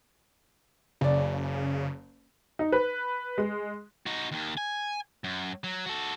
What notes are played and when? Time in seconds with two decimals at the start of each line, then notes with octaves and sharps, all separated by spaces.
1.01 F#1 C#3 D5
2.59 D#4
2.72 B4
3.38 G#3
4.06 D#4 F#4
4.32 D#2 D#3
4.57 G#5
5.24 F#2
5.64 F#3
5.86 F#4 A4